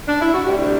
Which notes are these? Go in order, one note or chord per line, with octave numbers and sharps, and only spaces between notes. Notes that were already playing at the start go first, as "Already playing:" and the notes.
D4
E4
F#4
D2 C3 G3 D4 G4